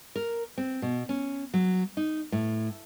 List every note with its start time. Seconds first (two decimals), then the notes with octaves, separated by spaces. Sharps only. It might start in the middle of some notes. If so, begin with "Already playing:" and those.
0.16 A#4
0.58 C4
0.82 B2
1.09 C#4
1.54 F#3
1.97 D#4
2.32 A2